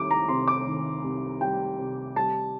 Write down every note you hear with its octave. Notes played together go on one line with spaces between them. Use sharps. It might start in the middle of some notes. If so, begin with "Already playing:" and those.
Already playing: C2 D#3 G3 D6
A#5
C3 C6
D6
D#3
C2
G3 G5
C3
G3 A5